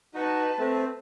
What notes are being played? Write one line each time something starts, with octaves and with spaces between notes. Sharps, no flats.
D#4 F#4 B4 A5
A3 C4